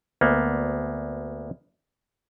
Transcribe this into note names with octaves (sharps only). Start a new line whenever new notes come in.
D2 A#3 B3